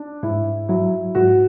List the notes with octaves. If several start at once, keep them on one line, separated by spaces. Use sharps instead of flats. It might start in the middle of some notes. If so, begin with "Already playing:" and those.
Already playing: D4
G#2 E4
F#3 E4
G#2 F#4